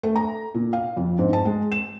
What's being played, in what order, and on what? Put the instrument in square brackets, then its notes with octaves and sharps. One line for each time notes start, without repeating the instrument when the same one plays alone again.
[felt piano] A3
A#5
A#2
F5
F2
G#2
A5
G#3
E7